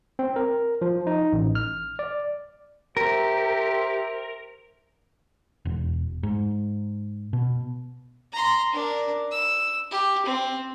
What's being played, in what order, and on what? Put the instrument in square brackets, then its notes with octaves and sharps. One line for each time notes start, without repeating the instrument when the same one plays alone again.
[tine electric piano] C4
A#4
F3
D#4
A1
F6
D5
[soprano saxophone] G4 [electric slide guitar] A#4 [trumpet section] C5 E5
[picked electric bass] E1
G#2
B2
[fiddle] A#5 C6
D4 A#4
E6
G4
C4